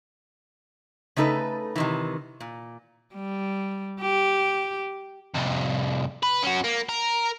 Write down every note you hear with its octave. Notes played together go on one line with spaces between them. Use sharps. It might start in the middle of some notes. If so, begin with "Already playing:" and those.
C#3 A3 D#4 A4 B4
C3 D#3 E3
A#2
G3
G4
C2 F2
B4
C#4 F#4
A#3
A#4